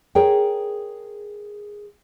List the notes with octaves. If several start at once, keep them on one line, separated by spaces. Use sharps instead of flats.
G#4 A#4 C#5 G5